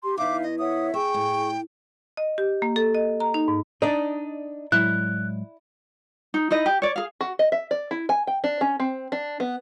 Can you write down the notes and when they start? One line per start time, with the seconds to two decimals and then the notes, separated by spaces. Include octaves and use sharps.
0.03 G4 C6
0.18 E2 E3 D#4 E5 F5 D6
0.43 D#5
0.58 C#5 E5 F#5 D#6
0.94 G#4 E5 G5 C#6
1.14 A2
2.17 D#5
2.38 G4
2.62 A#3
2.76 A4
2.95 D#5
3.20 A#5
3.34 D#4
3.48 G#2
3.82 D4 D#4 D5 D#5
4.72 A2 F#3 G#3 E4 F#6
6.34 D#4
6.51 D#4 E4 D#5
6.66 G4
6.82 C#5 D5
6.96 G#4 F5
7.21 F#4
7.39 D#5
7.52 E5
7.71 D5
7.91 E4
8.09 G#5
8.27 G5
8.44 D4
8.61 C#4
8.80 C4
9.12 D4
9.40 B3